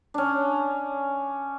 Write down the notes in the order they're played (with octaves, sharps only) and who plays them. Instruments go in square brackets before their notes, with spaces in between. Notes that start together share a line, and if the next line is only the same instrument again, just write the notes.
[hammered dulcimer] C#4 D4